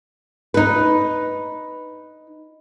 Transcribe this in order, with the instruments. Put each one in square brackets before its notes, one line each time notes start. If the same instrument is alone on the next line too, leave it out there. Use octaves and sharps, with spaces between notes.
[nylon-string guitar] D#4 B4